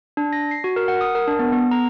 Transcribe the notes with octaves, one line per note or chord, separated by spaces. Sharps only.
D4
A#6
C7
F#4
A#4
F#5
D#6
A#4
D4
B3
B3
A#5